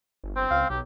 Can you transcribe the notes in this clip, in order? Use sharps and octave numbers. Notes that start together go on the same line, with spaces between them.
G1
C4 C5
C#2 F5
B1 F#3 G4